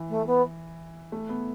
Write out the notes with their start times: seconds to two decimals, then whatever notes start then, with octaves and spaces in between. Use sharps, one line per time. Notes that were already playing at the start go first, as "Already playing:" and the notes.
Already playing: E3
0.10 A3
0.26 B3
1.12 A3
1.29 B3